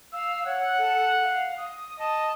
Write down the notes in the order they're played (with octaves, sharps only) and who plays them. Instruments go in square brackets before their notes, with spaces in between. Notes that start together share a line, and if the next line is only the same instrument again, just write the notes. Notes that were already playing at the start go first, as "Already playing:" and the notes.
[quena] F5 [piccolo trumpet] E6
[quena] C#5 [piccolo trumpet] F#5
[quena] A4
F5
D#6
[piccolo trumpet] D#5 [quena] A5